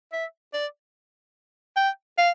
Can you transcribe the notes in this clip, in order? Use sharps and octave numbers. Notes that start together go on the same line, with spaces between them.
E5
D5
G5
F5